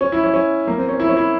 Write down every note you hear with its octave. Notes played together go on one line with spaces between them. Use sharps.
C#4
E4
C#4
C#4
A#3
C4
C#4
E4
C#4
E4